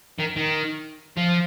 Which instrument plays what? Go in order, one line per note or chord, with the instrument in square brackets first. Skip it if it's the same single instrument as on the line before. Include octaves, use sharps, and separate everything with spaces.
[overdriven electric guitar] D#3
D#3
F3